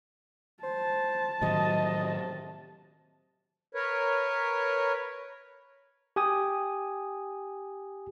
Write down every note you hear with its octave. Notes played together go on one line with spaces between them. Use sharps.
C5 A5
A2 C3 D#3 F#3 D#5
A#4 B4 C#5
G4 G#5 D#6